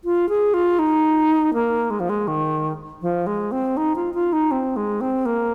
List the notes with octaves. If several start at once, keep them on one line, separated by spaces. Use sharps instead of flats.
F4
G#4
F4
D#4
A#3
G#3
F3
G#3
D#3
F3
G#3
C4
D#4
F4
F4
D#4
C4
G#3
C4
A#3